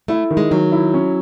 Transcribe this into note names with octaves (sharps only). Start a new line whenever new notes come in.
A3 E4
D#3
G#3
D#3 F#3
E4
C#4